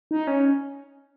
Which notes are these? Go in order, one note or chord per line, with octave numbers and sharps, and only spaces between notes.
D#4
C#4